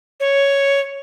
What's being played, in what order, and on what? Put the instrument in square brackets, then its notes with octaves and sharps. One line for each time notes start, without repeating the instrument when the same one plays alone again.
[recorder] C#5